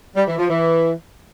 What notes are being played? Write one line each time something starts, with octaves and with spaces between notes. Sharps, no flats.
G3
E3
F3
E3